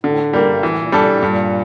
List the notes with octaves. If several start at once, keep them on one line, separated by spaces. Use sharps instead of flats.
A2 D3
A2
G3 A#3
G2
A2 E3
A#2
A#2 G3 D4 A4
A2
G2 A#2